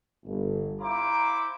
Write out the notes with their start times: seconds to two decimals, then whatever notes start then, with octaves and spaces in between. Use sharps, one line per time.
0.24 G1
0.80 E4 C5 F5 A#5 D6